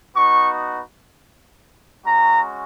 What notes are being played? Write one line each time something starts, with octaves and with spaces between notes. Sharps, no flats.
B3 D#4 F#4 C#6
G#3 C#4 F#4 A#5